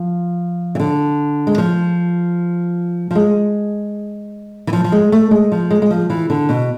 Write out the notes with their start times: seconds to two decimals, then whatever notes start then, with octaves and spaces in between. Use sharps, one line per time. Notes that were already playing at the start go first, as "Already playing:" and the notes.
Already playing: F3
0.75 E3
0.80 D3
1.47 G#3
1.58 F3
3.11 F3
3.15 G#3
4.67 E3
4.73 F3
4.84 F3
4.92 G#3
5.12 A3
5.31 G#3
5.52 F3
5.71 G#3
5.82 G#3
5.91 F3
6.10 E3
6.30 D3
6.49 B2